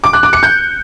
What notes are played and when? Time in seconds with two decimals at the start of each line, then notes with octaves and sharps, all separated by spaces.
0.04 D6
0.13 F#6
0.23 D6
0.33 C#7
0.43 G6